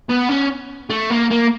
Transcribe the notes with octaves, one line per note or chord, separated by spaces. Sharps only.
B3
C#4
A3
A#3
A#3